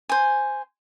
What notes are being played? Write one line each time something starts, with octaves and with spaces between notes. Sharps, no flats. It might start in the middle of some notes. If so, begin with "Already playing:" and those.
C5 G#5